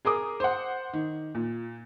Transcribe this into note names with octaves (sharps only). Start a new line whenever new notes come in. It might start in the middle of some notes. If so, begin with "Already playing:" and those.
G#4 A#4 D6 D#6
C5 F#5
D#3
A#2